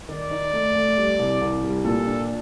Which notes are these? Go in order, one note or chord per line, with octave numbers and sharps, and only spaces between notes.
D#3 D5
D#4
A3
A3
G3
C2
C2
G3
A#2 A4
D4